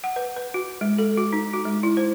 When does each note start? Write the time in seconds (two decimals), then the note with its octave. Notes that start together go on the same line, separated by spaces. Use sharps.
0.04 F#5
0.16 B4
0.36 B4
0.54 F#4
0.81 G#3
0.98 A4
1.17 F#4
1.33 D#4
1.53 F#4
1.65 G#3
1.83 E4
1.97 C5